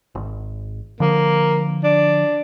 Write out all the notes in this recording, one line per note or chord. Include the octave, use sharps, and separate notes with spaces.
G#1
D3 F3 A#3
D4